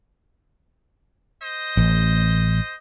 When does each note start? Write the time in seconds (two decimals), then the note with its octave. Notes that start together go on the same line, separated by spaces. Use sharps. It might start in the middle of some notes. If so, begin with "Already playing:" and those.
1.42 C5 D#5
1.77 A1